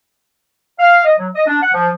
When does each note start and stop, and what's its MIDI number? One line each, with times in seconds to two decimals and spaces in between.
0.79 1.03 77
1.05 1.13 75
1.18 1.29 54
1.35 1.44 75
1.47 1.60 62
1.61 1.73 78
1.74 1.88 53